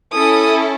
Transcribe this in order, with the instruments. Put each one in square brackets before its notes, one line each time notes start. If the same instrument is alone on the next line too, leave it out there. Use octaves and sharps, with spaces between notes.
[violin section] C#4 E4 A4 D#6